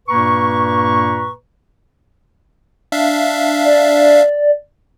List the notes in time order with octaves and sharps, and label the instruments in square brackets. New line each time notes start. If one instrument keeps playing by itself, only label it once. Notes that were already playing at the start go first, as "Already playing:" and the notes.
[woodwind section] G2 A#2 A#3 B4 A#5 C#6
[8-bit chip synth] D4 E5 F5
[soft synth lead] D5